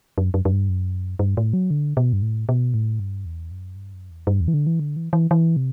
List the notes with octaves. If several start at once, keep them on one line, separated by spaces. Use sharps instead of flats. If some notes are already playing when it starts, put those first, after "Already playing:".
F#2
F#2
F#2
G2
F#2
G2
A2
F#3
D3
B2
G2
A2
B2
A2
G2
E2
F#2
G2
F#2
E2
G2
E2
E3
D3
E3
D3
E3
E3
E3
C3